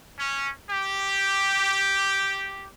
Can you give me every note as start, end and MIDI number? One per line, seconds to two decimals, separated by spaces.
0.18 0.50 61
0.70 2.66 67